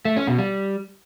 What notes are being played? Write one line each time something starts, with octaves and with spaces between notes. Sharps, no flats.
A3
C#4
B2
G3